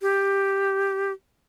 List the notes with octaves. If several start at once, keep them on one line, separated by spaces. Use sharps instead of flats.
G4